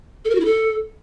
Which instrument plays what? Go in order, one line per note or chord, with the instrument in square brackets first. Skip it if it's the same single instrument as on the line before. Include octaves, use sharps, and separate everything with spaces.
[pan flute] A4
A#4
F#4
E4
A4